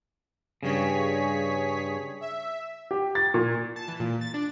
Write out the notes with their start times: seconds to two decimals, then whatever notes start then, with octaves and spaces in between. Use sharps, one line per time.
0.63 G2 C#3 G#4 C#5 B6
2.21 E5
2.91 G4
3.15 A6
3.34 A#2
3.76 A5
3.88 E3
4.00 A#2
4.21 A6
4.34 D4